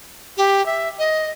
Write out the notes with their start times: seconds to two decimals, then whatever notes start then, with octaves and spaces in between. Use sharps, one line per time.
0.37 G4
0.66 E5
0.99 D#5